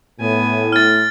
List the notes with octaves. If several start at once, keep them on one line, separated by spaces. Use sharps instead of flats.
A2 B3 G#5
F6 A6